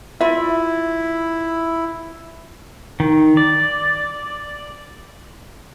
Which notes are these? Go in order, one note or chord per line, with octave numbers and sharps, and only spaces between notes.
E4 F4 E5
D#3
D5